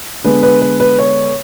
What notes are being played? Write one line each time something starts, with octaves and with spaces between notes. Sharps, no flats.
D3 G#3 B3 B4
B4
B4
B4
C#5